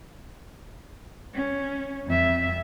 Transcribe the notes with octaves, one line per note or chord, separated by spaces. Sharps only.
C#4
F2 E5